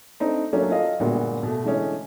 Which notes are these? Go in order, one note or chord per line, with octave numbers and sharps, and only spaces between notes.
A3 C4 D4 D#4
F#3 A3 A#3 C#4 D4
F4 A4 D#5 F5
G1 A#2 G#3 B3 F#4
B2 A3
D3 E3 G#3 A3 C#4